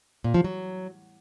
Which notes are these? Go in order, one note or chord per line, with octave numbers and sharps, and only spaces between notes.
A#2
F3
F#3